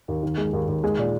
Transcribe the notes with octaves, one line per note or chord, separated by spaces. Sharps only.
D#2
D#3
G#3
D#2
D#2
G#3
A#2